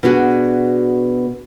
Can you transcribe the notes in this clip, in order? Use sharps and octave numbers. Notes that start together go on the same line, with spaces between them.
B2 B3 D4 F#4 G#4